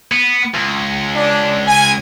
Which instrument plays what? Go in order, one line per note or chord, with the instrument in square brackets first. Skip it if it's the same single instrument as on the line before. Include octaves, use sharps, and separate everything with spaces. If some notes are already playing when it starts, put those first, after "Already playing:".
[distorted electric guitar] B3
C#2
[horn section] D4
G#5